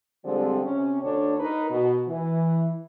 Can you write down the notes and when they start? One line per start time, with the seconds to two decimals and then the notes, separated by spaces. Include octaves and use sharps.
0.25 D3 F3 G3 G#3 C4
0.64 C3 C#4
1.03 D2 D4 A4 C#5
1.39 D#4 A#4 B4
1.70 B2
2.08 E3